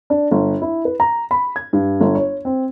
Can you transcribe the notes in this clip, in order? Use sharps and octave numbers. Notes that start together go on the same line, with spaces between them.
D4
G1
E4
B4
A#5
B5
G#6
G2
G1
C#5
C4